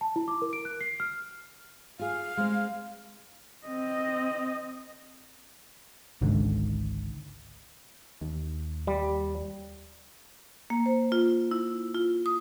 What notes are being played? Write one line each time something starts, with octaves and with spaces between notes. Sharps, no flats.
A5
E4
D6
A#4
D7
F#6
C7
F6
F4 G#4 F5
G#3 C4
C4 D#5
G#1 C#2 G#2 D3
D#2
G3
A#3
C5
F4
E4
F4
D#6